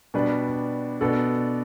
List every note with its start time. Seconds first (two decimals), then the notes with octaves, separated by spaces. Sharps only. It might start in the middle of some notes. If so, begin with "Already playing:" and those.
0.14 B2 G3 D4 B4
1.01 B2 B3 D4 A4 D5